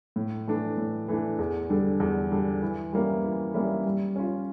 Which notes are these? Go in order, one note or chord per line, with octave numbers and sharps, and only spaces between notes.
A2
E3 A3 D4
A2
E3 A3 D4
E2
D3 G3 D4 A4
E2
D3 G3 D4 A4
E3
G3 A#3 C#4 E4
E3
G3 A#3 C#4 E4
G3
C#4 F4